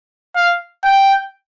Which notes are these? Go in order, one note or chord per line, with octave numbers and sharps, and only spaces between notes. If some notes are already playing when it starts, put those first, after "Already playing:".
F5
G5